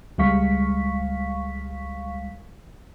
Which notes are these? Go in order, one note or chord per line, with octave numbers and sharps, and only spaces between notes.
C#2 G3 G#3 F5 C#6 B6